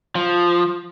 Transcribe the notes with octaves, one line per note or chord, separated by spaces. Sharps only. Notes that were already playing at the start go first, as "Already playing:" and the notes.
F3